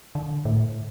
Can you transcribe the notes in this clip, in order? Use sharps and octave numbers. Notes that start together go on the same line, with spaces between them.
D3
A2